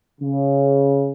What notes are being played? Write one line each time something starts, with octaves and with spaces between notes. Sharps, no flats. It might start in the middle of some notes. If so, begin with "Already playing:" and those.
C#3